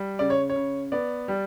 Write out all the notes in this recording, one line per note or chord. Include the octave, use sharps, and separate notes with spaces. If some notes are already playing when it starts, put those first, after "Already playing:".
Already playing: G3
C#3 D5
C#5
C#5
C#3
B3 D5
G3